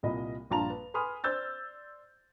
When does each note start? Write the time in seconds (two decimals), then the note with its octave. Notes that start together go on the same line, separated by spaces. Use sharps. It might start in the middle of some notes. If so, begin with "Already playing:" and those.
0.03 C2 A#2 D#5 B5
0.51 A#1 G2 F4 A5 A#5 F7
0.70 B4
0.94 B4 G#5 B5 C6 D#6 F6
1.24 C5 D5 E6 G6 A6